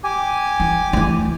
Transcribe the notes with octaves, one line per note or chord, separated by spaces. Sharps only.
G4 G#5
E3
D2 E3